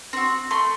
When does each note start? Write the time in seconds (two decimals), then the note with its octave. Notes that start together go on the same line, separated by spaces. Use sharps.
0.13 C4 F#4
0.51 A3 C6